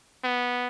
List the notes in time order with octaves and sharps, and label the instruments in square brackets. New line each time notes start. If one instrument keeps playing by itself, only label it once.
[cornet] B3